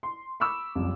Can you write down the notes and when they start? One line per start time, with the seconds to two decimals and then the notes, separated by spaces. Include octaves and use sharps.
0.03 C6
0.40 B5 C#6 D6 E6
0.75 F#1 C2 F2